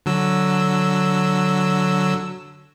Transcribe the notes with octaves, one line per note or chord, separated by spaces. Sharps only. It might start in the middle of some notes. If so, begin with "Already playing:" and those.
D3 F#3 E6